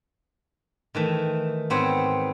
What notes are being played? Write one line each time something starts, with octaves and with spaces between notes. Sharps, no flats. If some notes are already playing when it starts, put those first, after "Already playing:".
D#3 E3 A3
G#2 B3 C4 C5 C#5 B5